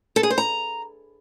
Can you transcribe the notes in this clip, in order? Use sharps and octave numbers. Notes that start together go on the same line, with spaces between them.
A4
G#4
C5
A#5